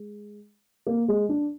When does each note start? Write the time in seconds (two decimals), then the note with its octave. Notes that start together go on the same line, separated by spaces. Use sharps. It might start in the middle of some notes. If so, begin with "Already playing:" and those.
Already playing: G#3
0.87 A#3
1.08 G#3
1.29 D4